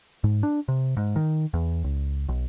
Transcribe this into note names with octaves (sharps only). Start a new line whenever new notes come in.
G#2
D4
C3
G#2
D#3
E2
C#2
B1